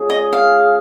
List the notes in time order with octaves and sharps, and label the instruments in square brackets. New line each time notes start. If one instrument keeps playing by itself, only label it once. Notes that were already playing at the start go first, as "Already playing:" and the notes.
Already playing: [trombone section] G#3 C#4 F4 G#4
[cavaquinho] D#5
F5